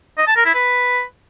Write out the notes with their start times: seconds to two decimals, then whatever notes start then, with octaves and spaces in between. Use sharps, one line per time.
0.18 D#5
0.27 A5
0.36 A#4
0.46 E4
0.55 B4